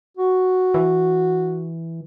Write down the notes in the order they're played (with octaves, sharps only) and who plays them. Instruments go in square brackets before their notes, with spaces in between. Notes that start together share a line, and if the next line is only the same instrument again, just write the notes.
[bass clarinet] F#4
[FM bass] E3